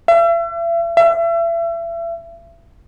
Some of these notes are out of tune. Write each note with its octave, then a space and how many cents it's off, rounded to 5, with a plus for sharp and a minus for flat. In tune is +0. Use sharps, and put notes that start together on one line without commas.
E5 +40
E5 +35